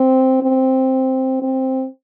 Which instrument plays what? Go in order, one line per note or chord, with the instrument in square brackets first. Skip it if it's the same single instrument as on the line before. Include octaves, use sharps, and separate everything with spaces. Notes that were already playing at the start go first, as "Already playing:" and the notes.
Already playing: [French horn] C4
C4
C4